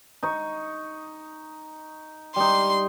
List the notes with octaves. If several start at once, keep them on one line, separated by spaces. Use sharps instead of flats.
D#4 C#6
G3 D#4 C6